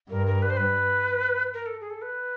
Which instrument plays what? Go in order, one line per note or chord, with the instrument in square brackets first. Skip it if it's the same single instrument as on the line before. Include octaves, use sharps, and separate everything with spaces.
[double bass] G2 [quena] A#4
[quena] A#4
B4
C5
B4
A#4
A4
G#4
A4
B4